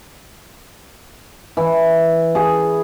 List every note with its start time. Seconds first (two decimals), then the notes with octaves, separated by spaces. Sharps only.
1.57 E3
2.35 G#4